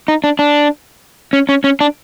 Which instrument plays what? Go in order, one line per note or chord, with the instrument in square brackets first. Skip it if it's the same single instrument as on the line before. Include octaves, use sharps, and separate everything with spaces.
[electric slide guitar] D#4
D4
D4
C#4
C#4
C#4
D4